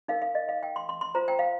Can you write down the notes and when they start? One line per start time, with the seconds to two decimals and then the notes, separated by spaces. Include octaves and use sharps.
0.08 D#4 A#4 F5
0.22 F5
0.35 D#5
0.49 F5
0.63 G5
0.76 C6
0.89 C6
1.01 C6
1.15 F4 C5 A#5
1.28 G5
1.39 F5